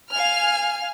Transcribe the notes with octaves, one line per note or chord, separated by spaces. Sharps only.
F5 G#5 F6